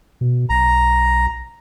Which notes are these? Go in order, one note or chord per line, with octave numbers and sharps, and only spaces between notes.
B2
B1 A#5